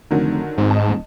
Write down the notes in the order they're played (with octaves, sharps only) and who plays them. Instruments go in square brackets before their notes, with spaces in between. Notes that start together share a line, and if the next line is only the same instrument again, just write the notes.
[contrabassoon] F1 [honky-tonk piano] D3 D#3 F#3
[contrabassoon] G#1 [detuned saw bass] G#2 [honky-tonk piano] C4
[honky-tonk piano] D#5 A5
[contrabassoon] D#1